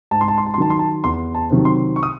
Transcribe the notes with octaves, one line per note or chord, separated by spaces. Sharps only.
G#2 A5
C6
A5
C6
A5
C6
D#3 F#3 A5
C6
A5
E2 C6
A5
C3 D#3 F#3
C6
C#6
D#6